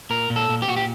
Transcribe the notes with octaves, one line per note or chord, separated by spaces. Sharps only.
A#2 A#4
A#2
A4
A#2
G4
A#2 F#4
G4